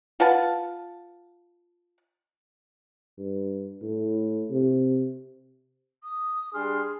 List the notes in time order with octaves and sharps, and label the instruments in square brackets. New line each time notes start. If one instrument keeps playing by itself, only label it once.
[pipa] F4 B4 F#5 A5
[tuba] G2
A2
C3
[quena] D#6
[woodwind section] G3 D4 C6 [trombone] G#4 [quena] F6